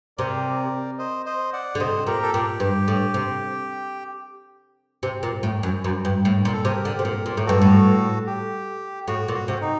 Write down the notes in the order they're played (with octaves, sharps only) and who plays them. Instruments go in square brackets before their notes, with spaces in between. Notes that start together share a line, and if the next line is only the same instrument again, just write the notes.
[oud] C3 [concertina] A#4 D5
[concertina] C5 D#5
C5 D#5
D5 F#5
[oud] D3
[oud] C3 [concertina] C5 D#5
[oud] A#2 [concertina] G4 A#4
[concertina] A4
[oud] A#2 [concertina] G4
[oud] G2
A2
C3
C3
A#2
A2
F#2
F#2
G2
A2
A#2
[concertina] A4
[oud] C3 [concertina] G4 A#4
[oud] D3
C3
A#2
A#2
A2
[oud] G2 [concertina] F#4 A4
[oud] A2
[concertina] G4
[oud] A2 [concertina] F#4
[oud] A#2
[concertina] F#4
[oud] C3
[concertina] D#4